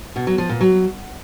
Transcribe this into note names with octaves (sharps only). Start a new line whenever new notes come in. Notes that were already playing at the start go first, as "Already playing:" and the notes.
B2
F#3
F3
A#2
F#3